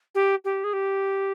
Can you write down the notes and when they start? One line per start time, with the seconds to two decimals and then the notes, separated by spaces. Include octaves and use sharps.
0.15 G4
0.45 G4
0.64 G#4
0.73 G4